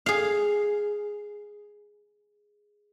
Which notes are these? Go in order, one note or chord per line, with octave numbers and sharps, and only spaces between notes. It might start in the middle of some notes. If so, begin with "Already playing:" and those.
G#4 F5